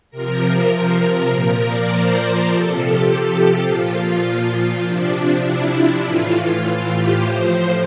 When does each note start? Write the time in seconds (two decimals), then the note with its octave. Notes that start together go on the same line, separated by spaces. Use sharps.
0.11 C3 F3 A#4
0.70 A#4
1.29 A#2 F3
1.58 D5
1.88 C5
2.47 C3 F3 A4
2.77 G4
3.06 G4
3.36 G4
3.65 A#2 F3 F4
3.95 F4
4.24 F4
4.54 F4
4.83 C3 F3 D4
5.43 E4
5.72 E4
6.01 A2 E3 F4
6.31 F4
6.90 G4
7.19 A2 F3 C5